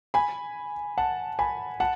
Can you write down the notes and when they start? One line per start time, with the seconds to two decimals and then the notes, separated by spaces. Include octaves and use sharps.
0.14 G#5 B5
0.98 F#5 A5
1.39 G#5 B5
1.80 F#5 A5